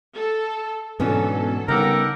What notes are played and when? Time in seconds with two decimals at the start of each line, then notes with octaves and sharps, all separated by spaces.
0.14 A4
1.00 G#2 B2 E3 F#3 B3 C#4 D4 A4
1.68 C#3 G3 B3 D#4 G4 A4 A#4 F#5